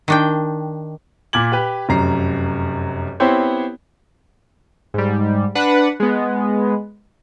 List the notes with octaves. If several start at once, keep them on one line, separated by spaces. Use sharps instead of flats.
D#3 D4 G5
A#2 D6 G#6 F#7
G4 B4
F1 F#2 A#5 C7
B3 C4 E4 G4 C5 C#5
G#2 G3
D4 B4 F#5
G#3 B3